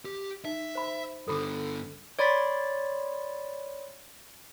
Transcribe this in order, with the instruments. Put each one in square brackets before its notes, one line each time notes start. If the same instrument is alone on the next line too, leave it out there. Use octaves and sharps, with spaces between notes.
[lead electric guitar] G4
[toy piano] D#4 [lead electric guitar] E5
[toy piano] C5 B5
[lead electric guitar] G2 D3 [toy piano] A4 B5 D6
[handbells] C#5 D5 B5 C6 A6 B6